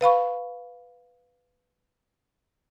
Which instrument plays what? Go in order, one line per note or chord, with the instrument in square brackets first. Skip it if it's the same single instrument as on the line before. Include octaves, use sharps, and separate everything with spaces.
[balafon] B4 F5 B5 C#6